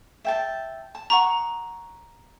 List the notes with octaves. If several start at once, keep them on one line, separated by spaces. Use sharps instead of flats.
E5 G5 A5
A5
F#5 A#5 C#6 D#6